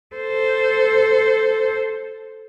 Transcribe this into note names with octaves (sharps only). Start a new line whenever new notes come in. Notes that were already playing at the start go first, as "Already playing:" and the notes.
A4 C5